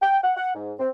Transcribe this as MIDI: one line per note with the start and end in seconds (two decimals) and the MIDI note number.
0.01 0.18 79
0.23 0.32 78
0.37 0.49 78
0.55 0.73 44
0.79 0.89 60